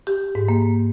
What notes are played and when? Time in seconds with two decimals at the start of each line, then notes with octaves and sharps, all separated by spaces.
0.07 G4
0.35 G#2
0.49 A#3